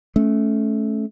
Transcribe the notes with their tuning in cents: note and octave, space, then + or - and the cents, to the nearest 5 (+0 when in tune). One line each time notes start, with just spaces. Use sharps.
A3 -20 C#4 +0